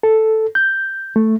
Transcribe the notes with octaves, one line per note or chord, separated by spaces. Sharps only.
A4
G6
A3